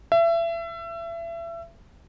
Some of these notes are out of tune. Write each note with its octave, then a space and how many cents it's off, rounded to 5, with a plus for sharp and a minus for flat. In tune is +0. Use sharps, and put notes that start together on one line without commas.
E5 +30